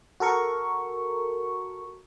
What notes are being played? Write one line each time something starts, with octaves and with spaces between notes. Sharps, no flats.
F#4 A4 A#4 C#6